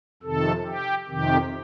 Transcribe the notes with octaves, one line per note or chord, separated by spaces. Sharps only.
F2 C3 D#3 A4
G4
F2 C3 D#3 G4